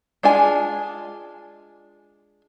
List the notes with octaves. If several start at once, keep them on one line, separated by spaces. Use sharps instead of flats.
G#3 D4 F4 G#5